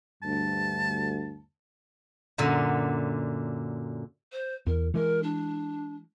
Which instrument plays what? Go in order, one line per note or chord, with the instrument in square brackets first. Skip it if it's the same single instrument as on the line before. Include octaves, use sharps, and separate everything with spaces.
[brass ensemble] D2 G2 [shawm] A5
[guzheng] F#2 A#2 D3
[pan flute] C5
[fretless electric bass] E2 [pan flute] A#4
[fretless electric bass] E3 G#3 [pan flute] A#4
[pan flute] D4